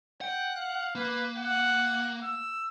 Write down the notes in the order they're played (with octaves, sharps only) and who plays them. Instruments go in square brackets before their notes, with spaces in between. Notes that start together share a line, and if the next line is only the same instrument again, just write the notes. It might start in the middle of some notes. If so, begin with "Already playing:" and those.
[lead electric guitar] F#5 [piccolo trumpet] G5
[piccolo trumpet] F5
[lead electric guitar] A#3 [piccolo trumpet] B4
[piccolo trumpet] F#5
E6